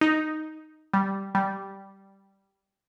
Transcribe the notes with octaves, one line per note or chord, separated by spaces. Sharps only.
D#4
G3
G3